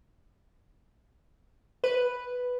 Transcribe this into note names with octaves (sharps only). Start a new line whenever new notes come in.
B4